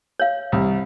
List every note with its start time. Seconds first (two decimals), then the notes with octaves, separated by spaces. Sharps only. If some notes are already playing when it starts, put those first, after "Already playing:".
0.20 C#5 F5
0.52 C2